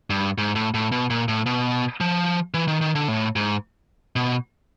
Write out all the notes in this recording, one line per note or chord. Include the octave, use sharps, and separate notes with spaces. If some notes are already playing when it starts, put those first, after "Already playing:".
G2
G#2
A2
A2
B2
A#2
A2
B2
F3
E3
D#3
D#3
D3
A2
G#2
B2